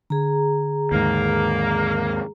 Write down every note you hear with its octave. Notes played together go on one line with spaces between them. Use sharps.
D3 G#4 A#5
D#2 G#2 A#3